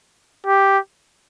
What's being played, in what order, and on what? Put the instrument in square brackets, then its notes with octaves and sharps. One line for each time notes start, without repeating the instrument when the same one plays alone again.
[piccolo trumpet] G4